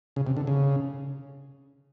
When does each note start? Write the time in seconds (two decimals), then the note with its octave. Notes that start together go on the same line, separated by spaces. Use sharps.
0.16 C#3
0.27 C3
0.37 D3
0.47 C#3